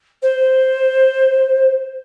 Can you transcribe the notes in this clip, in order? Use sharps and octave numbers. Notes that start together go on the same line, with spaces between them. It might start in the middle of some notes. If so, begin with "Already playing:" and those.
C5